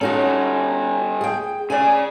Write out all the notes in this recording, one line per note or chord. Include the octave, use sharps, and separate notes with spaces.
G3 C#4 D#4 F#4 A4
G#4 G5
C#3 G#4 D5 G#5